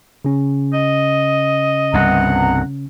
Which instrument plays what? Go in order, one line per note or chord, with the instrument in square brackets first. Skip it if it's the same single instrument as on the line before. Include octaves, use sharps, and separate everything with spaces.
[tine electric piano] C#3 C#4
[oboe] D#5
[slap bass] C2 G2 [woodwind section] B3 F#5 A#5